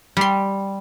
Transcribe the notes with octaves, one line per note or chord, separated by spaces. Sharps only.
G3 C6